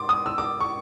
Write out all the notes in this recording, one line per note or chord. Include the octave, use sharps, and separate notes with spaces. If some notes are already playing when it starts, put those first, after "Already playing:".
Already playing: C6 D6
D#6
E6
D6
C#6